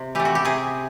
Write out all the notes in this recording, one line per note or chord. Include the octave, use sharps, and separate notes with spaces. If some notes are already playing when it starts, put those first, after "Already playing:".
Already playing: C3
E3 A3 G4
F#4
G4
C3 G#4